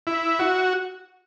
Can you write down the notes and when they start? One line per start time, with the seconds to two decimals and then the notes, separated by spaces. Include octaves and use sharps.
0.07 E4
0.39 F#4